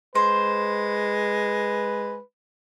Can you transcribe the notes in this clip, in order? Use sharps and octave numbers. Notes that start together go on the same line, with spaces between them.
G#3 B4 C5